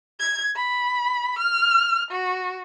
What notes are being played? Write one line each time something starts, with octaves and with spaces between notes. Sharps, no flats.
G#6
B5
F6
F#4